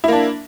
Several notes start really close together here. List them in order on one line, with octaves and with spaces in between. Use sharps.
E4 A#3 D4